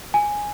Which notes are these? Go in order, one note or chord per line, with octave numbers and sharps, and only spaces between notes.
G#5